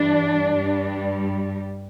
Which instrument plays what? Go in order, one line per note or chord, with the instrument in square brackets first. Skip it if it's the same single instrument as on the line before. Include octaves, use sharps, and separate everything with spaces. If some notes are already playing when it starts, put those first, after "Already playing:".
Already playing: [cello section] G2 E3 G3 D4
G2 G3